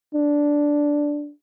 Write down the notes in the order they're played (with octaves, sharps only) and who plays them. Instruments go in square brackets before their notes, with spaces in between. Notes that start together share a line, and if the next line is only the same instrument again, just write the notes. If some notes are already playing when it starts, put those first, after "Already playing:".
[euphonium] D4